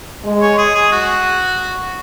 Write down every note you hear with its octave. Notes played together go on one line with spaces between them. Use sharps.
G#3
C#5
G#4
G#4
F#4